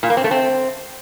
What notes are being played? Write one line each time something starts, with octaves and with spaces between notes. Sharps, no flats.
A#2
A#3
C4
A3
C4